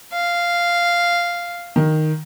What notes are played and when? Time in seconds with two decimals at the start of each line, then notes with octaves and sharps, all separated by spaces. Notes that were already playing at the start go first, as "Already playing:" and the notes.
0.13 F5
1.76 D#3